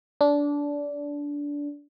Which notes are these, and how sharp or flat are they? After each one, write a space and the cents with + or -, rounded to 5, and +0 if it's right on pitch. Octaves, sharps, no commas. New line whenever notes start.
D4 -20